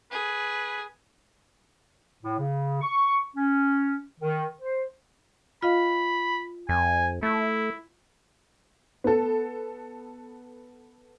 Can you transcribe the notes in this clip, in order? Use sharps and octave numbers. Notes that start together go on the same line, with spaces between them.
G#4 B4
A2
C#3
C#6
C#4
D#3
C5
F4 D#5 F5 B5
F2 G#5
A3 E4
B3 A4